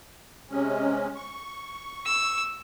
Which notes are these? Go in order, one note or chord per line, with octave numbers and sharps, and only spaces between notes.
C3 G#3 C#4
C#6
E6